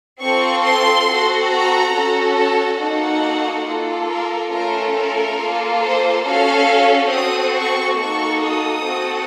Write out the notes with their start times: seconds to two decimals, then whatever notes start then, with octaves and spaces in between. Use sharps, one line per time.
0.21 C4 F4 A4 C#6
0.64 C6
1.08 C4 F#4 A4
1.50 A#5
1.93 C#4 F#4 A4
2.37 A5
2.79 A#3 D#4 F#4 A4 F#5
3.66 A#3 F4 A4
4.09 A#4
4.52 A3 C#4 F4 A4 A#4
4.96 A#4
5.38 A#3 F4 A4
5.81 C5
6.25 C#4 F#4 A4 F5
7.11 C4 F#4 A4 D#6
7.55 C#6
7.97 A#3 D#4 F#4 A4 C#6
8.40 D#6
8.84 C4 F#4 A4